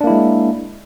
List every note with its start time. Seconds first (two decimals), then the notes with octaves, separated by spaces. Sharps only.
0.01 D4
0.04 A#3
0.07 E4
0.10 G#3